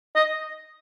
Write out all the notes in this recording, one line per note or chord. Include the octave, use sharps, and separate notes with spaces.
D#5